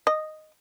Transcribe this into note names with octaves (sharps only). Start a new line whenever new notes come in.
D#5